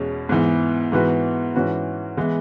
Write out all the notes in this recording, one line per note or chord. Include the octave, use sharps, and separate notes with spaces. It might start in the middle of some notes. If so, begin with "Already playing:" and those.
Already playing: E2 B2 G#3 C#4
G#2 E3 B3
G#2 E3 B3 F#4 B4
G#2 E3 C#4 F#4 B4
E3 G#3 B3 E4